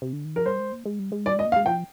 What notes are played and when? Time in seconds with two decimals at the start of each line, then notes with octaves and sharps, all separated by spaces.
0.02 C3
0.13 D3
0.25 D#3
0.35 F3 A#4
0.46 G3 C5
0.59 G#3
0.72 A#3
0.86 G#3
0.99 G3
1.12 G#3
1.26 G3 D5
1.36 G#3 D#5
1.46 A#3
1.52 F5
1.56 G#3
1.66 F3 G5